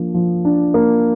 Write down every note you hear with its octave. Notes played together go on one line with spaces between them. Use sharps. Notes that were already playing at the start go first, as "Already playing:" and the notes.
Already playing: F3 A#3 D4
F3
D4
A#3